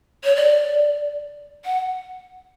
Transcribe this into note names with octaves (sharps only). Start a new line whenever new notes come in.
C#5
D5
F#5